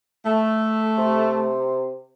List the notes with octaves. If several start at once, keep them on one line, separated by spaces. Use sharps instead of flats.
A3
C3